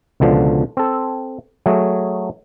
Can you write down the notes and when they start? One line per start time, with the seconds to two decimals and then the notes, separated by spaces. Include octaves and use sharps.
0.20 C#2 B2 D3 F3
0.77 C4 A4
1.66 F#3 A3 G#4